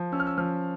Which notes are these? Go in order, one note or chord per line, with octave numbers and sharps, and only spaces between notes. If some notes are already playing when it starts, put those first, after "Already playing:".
Already playing: F3
C#4 E6
F6
E6
F3 F6